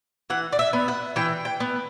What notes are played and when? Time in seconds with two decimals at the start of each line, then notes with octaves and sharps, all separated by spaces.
0.30 E3 F#5
0.52 D5
0.59 E5
0.73 B3
0.88 F#5
1.16 E3 G5
1.45 G5
1.60 B3